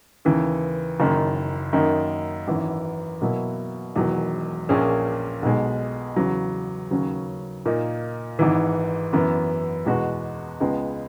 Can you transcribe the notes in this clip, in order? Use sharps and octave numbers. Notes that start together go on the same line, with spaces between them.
D#2 C#3 E3
F#1 F#2 D#3
F#2 D#3 A#3 D#4
G#1 F#2 E3
B2 F#3 A#3 E4
E1 E2 D#3 F#3
A#1 A#2 A#3 C#4 G#4
B1 B2 G#3
E2 C#3 F#3
D#2 C#3 F#3 C#4
A#2 A#3 D#4
G#1 G#2 E3
F#2 E3 B3
E2 B2 G#3 B3 F#4
C#2 C#3 G#3 B3